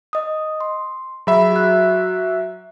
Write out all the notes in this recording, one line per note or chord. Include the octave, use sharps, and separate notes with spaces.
D#5 D#6
C6
F#3 G#4 E5 B5
F#4 F#6